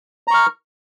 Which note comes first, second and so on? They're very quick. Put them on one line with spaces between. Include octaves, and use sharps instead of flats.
A#5 C#6 F6